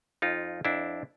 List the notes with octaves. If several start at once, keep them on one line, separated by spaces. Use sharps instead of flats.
F2 D#4 F4
F2 D4 E4